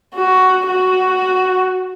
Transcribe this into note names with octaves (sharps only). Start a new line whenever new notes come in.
F#4
F#4